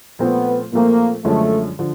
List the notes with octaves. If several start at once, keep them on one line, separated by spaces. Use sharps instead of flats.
A#2 F3 A3 B3 C4
A#2 F3 A3 A#3 C4
F#2 D3 F3 G#3 A3 C#4
D3 F3